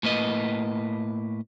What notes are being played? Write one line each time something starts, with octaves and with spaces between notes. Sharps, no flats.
A2 A#3 B4 D#5